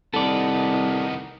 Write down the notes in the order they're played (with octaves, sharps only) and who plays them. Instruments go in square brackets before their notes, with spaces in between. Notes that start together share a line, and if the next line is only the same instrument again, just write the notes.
[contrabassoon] C2 [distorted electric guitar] D#3 B3 [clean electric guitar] A4 D5